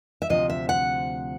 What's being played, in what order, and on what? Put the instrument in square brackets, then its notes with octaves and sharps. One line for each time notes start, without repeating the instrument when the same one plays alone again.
[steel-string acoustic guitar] E5
D2 C3 F3 D#5
E5
F#5